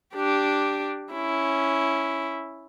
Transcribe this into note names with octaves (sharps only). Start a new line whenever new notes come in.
D4 G4
C#4 E4